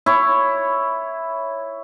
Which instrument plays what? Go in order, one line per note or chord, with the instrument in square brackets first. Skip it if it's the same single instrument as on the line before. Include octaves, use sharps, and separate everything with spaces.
[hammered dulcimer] E4 C#5